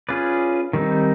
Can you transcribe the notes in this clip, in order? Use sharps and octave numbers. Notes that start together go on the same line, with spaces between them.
C#4 F4 G#4 B4 D5
D#3 G3 C4 D#4